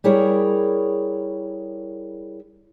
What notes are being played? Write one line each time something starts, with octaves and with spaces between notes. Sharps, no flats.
G3 E4 G#4 A#4 C#5